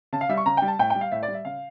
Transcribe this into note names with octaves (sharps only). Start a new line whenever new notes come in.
C#3 A5
F5
G3 E5
C#6
C#3 A#5
G3 G5
A5
A2 G5
G3 G5
F5
A2 E5
D5
G3
E5
C#3 F5